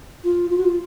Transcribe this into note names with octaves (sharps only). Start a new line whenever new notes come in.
F4
F4
F#4
F4